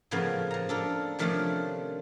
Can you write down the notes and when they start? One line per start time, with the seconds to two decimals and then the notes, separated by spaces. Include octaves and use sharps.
0.11 A2 C#3 F3 A#3 B3
0.51 F3 A#5
0.69 D4 A4 A#4
1.19 C3 D#3 F3 A3 C#4 D4